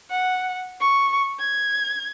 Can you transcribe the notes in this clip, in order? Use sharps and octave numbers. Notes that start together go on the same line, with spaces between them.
F#5
C#6
G#6